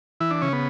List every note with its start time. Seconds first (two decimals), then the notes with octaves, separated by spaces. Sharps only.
0.21 E3 E4
0.31 D4
0.41 C#3 C#4
0.53 B3